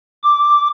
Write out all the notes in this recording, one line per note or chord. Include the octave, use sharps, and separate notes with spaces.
D6